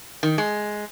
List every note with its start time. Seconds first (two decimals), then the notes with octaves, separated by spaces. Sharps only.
0.23 D#3
0.38 G#3